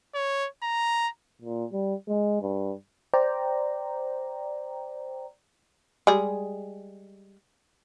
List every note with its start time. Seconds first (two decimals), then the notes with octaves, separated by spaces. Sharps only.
0.15 C#5
0.63 A#5
1.42 A#2
1.73 G3
2.08 G#3
2.41 G2
3.14 C5 D5 G5 A#5
6.07 G3 G#3 G#4